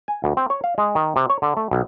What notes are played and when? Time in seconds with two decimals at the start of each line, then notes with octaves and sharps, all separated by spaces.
0.08 G#5
0.24 D2
0.37 C4
0.50 C#5
0.64 F5
0.78 G#3
0.95 D#3
1.16 C3
1.30 C#5
1.42 D3
1.57 A3
1.71 B1